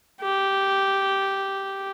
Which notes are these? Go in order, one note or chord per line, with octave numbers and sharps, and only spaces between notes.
G4